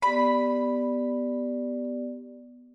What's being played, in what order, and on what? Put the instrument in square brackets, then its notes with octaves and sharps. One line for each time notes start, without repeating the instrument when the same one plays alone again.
[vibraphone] B3 G4 D5 [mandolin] B5